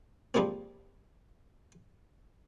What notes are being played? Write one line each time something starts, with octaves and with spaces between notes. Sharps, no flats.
F3 G3 G#3 A#3 C4